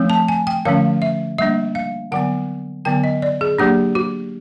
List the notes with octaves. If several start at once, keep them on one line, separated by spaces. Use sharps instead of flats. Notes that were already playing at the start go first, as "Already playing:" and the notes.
Already playing: F3 A3 C4
A5
G#5
G5
D3 F3 A3 C#4 F5
E5
G3 A#3 D4 E5
F5
D3 F#3 B3 F#5
D3 F#3 B3 G5
D#5
D5
G#4
F#3 A#3 D4 G4
F#4